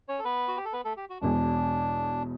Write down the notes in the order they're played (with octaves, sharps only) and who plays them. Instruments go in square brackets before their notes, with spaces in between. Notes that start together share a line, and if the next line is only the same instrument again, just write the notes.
[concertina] C#4 C#5
A4
B3 B4
F#4
G4
A4
B3 B4
A3 A4
G4
F#4
[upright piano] E1 E2 B2 [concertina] D4